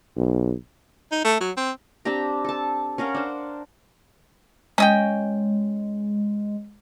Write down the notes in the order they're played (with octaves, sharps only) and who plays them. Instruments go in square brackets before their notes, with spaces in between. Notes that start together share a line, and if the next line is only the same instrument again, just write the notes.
[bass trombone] B1
[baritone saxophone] D#4
A3
F#3
C4
[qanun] C4 D4 G4 A#5
A4 A5
C#4 A#4 F5 F#5
D4 C5
[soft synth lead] G#3 [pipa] C#4 D#5 G5